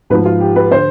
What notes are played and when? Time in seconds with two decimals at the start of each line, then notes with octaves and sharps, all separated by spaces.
0.10 G#2 B4
0.14 F3
0.25 F4
0.40 G4
0.56 B4
0.71 D3 C5